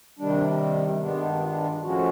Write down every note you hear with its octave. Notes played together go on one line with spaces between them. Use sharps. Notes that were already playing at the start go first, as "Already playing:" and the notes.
C3 D#3 G3 D4
G2 D#3 G#3 B3 D4
D#4
F4
F4
A2 F3 G#3 C#4 F#4